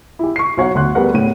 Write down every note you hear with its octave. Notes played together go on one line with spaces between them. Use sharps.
E4 G4
C#6 C7
B1 C#5 F#5
D2 C6 F#6
G3 B3 G#4 A#4 B4 F#5
A2 D#7